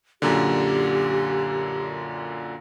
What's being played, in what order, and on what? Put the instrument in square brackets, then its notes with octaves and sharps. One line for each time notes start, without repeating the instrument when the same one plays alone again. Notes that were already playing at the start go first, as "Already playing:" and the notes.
[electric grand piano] F#2 A#2 D3 [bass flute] G4